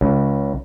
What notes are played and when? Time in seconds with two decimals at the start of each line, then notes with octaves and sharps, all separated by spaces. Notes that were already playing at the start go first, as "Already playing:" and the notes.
0.01 C#2